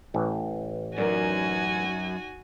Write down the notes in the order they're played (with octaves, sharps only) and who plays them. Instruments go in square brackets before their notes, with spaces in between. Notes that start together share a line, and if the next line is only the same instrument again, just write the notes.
[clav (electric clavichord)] A1 E3
[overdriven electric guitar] F#2 [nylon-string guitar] D#4 A#4 D5 [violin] F#4 G#5